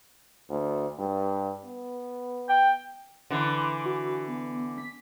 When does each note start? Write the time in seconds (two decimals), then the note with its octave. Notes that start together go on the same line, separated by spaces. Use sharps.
0.50 D2
0.99 G2
1.65 B3
2.49 G5
3.30 D3 E3 C6
3.86 F#4
4.28 B3
4.78 B6